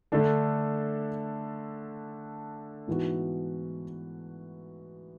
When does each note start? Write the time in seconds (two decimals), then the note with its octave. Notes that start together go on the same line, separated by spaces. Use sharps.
0.12 D3 A3 D4 A4
2.88 G#2 E3 B3 F#4